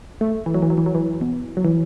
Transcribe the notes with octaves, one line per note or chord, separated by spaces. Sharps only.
A3
E3
F#3
E3
F#3
E3
F#3
E3
B2
F#3
E3